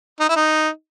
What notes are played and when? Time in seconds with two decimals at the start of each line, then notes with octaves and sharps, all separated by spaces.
0.20 D#4
0.29 E4
0.36 D#4